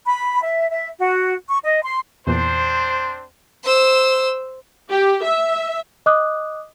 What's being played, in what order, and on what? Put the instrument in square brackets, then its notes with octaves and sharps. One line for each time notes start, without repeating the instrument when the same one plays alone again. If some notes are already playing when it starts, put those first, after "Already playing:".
[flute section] B5
E5
E5
F#4
C#6
D#5
C6
[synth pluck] E2 A#2 [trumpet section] C4 D4 C5
[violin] C5 E6
[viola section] G4
E5
[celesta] D#5 D6 D#6 F#6